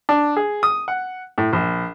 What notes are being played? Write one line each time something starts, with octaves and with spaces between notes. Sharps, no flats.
D4
G#4
D#6
F#5
A2
A#1